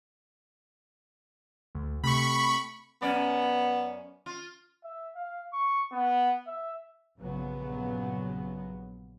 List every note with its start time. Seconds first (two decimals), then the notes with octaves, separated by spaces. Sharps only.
1.75 D2
2.04 C3 A3 B5 C#6
3.02 F#2 B3 C#4 D5
4.26 F4
4.84 E5
5.15 F5
5.53 C#6
5.92 B3
6.47 E5
7.19 A#1 G2 C#3 F#3 B3